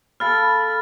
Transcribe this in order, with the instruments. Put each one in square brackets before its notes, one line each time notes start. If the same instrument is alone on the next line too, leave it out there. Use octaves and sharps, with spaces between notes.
[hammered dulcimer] A4 F5 A5 [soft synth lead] B5 [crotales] F6 A6